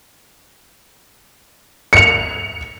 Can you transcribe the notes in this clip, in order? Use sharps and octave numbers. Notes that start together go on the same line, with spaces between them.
C#7 F7